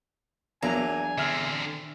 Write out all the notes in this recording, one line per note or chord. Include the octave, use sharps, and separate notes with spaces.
E2 F#3 A#3 D4 G#5 A#5
D3 C4 E5 F6